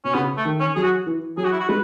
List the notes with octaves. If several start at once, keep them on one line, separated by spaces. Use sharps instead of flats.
B2 C#4
C#3 B3
A3
D#3
C#4
F#3 G#4
F#4
E3
F#3 G#4
F#4
E4
F#4
G#3 B4